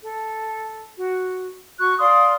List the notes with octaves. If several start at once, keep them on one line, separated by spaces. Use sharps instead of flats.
A4
F#4
F#4 C#6 F#6
D5 F5 C6 D#6